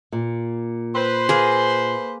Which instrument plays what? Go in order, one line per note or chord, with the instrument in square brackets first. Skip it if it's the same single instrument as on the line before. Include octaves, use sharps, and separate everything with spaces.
[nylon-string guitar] A#2
[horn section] B4 C5 C6
[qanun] A#3 G#4